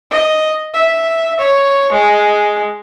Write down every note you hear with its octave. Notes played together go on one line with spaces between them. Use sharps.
D#5
E5
C#5
G#3